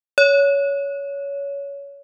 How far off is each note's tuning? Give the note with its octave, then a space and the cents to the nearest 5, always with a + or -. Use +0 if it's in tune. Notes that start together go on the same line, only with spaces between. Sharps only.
C#5 +20